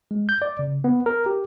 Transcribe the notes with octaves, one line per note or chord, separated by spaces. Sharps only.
G#3
G6
D5
C#3
B3
A#4
G4